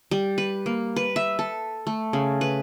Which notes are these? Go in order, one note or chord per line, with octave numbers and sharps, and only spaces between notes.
G3
B4
A#3
B4
E5
A4
A3
C#3
B4